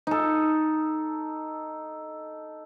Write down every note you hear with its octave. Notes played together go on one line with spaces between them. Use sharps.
D#4 A4